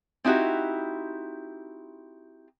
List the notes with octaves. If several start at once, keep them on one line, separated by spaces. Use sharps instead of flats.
C4 D#4 E4 F#4 G4